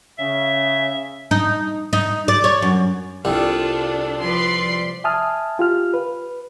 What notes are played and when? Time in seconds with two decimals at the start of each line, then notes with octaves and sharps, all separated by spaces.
0.19 C#3 E5
1.31 D#4
1.93 D#4
2.28 D5
2.44 C#5
2.62 F#2
3.25 C2 G3 D4 F4 A4
4.19 F3 B4 D5 C6
5.04 E5 G#5 A5 D#6 F6
5.59 F4 G4 F6
5.94 B4